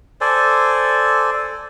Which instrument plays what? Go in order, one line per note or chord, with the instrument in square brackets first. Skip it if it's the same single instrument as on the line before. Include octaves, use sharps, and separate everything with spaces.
[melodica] A4 C5 D5 G#5